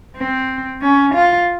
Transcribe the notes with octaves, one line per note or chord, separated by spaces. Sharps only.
C4
C#4
F4